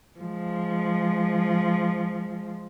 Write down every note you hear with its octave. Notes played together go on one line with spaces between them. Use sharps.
F3 G#3